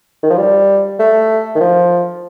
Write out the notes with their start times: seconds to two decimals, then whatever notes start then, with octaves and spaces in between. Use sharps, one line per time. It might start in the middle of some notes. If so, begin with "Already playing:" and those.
0.23 D#3
0.30 F3
0.37 G3
0.99 A3
1.55 D#3
1.61 F3